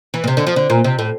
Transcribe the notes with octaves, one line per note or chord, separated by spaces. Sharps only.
E3
A#2
C3
D3
F3
D3
A#2
C3
A2